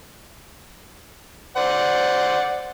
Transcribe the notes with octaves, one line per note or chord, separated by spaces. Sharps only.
C5 D5 F#5